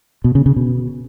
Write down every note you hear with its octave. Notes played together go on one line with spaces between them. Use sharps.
B2
C#3
C#3
B2